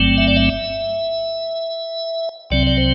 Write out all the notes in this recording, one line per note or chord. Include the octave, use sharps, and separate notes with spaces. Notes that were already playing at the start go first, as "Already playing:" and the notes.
Already playing: G1 G2 F#3 A3 C4
E5
D5
E5
C2 C3 F#3 C4 D5
D5
C5